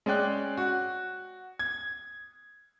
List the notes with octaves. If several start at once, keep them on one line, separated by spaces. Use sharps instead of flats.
G#3 C#4 D5 G5 F#6
F#4
G#6